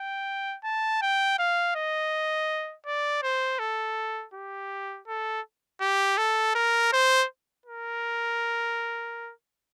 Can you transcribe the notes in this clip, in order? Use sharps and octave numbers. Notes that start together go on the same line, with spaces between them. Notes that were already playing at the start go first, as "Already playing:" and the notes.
Already playing: G5
A5
G5
F5
D#5
D5
C5
A4
G4
A4
G4
A4
A#4
C5
A#4